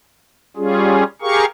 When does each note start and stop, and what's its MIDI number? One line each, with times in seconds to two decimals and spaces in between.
0.57 1.04 55
0.57 1.04 61
0.57 1.04 65
0.57 1.04 68
1.22 1.45 67
1.22 1.45 68
1.22 1.45 70
1.22 1.45 77
1.22 1.45 85